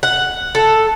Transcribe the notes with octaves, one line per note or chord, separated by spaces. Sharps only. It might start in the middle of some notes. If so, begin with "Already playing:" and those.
F#5
A4